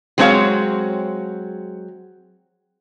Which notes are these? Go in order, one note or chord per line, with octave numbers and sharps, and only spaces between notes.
F#3 G#3 C4 D4 C#5 F5